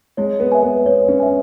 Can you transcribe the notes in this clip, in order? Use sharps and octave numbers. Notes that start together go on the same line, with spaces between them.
G#3 C#5
B3
E5 G#5
B3
B3 C#5
C#4
E5 G#5